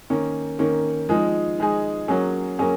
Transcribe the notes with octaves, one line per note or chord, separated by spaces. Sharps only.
D#3 A#3 C#4
D#3 A#3 C#4
F3 G#3 D#4 G#4
F3 G#3 D#4 G#4
F#3 A#3 C#4 G#4
F#3 A#3 C#4 G#4